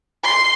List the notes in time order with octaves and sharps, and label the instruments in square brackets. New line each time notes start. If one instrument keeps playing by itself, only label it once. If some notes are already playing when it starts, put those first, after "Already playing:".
[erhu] C6